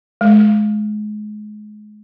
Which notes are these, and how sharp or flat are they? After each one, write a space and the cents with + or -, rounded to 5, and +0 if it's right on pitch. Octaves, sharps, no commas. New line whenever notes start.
G#3 +30